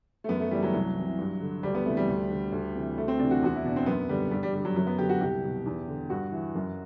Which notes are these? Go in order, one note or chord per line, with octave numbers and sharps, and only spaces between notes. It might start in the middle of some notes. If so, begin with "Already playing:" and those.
A3
F#2 B3
A3
E3 G3
F#3
C2
C3 E3
G2
D3
D2 G3
B3
C3 E3 A3
G3
D2
D3
D2
C3 E3
D2 A3
C4
C3 E3 D4
F#4
E2 F#4
E4
B2 D4
C4
F#2 B3
D3 G3
G2 G3
G3
D3 G3
F#3
F#2 F#3
B3
D3 G4
F#4
C2 G4
B2
E2
D3
G2 F#4
E3
F#2